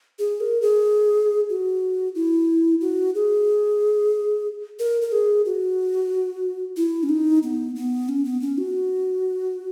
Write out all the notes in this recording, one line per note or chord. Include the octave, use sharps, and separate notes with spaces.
G#4
A#4
G#4
F#4
E4
F#4
G#4
A#4
A#4
G#4
F#4
E4
C#4
D#4
B3
B3
C#4
B3
C#4
F#4